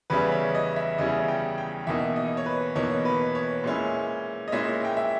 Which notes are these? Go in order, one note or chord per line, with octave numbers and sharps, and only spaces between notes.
E2 C#3 G3 C#4 E4 B4
C#5
D#5
E5
E2 C#3 G3 C#4 E4 D#5
G5
G5
E2 B2 A#3 D#4 E5
D#5
C#5
B4
E2 B2 A#3 D#4 C#5
B4
C#5
A#2 G#3 C#4 E4
D#5
A#2 G#3 C#4 E4 E5
G5
E5